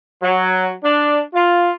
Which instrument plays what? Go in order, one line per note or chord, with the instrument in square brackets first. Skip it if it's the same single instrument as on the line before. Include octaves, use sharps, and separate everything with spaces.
[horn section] F#3
D4
F4